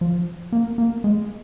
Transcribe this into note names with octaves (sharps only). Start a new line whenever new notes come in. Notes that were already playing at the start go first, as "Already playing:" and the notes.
F3
A#3
A#3
G#3